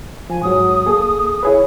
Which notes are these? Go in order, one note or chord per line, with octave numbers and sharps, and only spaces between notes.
F3 G#5
G#2 F#3 D#6
A#3 G#4 A4
E4 G#4 B4 C#5